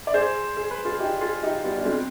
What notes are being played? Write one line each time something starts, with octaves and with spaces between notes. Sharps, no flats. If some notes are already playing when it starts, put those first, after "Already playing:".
D5
G#4 C5
G#4
B4
F4 G#4
D#4 G4
F4 G#4
D#4 G4
G3 B3
D4
G#3 C4